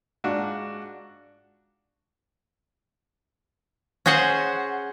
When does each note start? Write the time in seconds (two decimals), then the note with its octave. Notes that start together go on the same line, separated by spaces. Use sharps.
0.24 G#2 D4 F4 F#4
4.06 C#4 F#4 G#4 C5 F#5